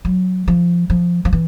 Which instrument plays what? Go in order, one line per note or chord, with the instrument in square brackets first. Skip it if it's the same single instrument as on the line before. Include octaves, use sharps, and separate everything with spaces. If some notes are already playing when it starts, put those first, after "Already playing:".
[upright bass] F#3
F3
F3
F3
E3